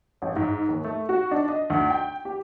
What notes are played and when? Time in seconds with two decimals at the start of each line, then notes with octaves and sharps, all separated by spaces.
0.22 A1
0.36 G#2
0.68 D#2
0.84 A3
1.09 F#4
1.31 D4
1.49 D#5
1.70 D2
1.90 G5
2.25 G4